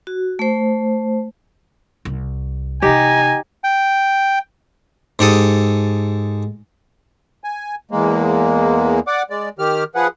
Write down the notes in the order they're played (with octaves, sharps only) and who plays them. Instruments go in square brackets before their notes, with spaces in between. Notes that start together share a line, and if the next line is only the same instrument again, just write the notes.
[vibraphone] F#4
A3 C5
[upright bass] C2
[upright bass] C3 E3 [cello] D#4 [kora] G4 [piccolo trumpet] G#5
[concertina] G5
[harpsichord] G#2 G4 A4 D#6
[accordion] G#5
E2 G#3 A#3
D5 F#5 D6
G#3 D5
D#3 G4 F6
F3 G#4 B4 F#5